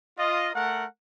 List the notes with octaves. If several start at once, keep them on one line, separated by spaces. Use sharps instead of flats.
F4 D#5
A3 A#4 F#5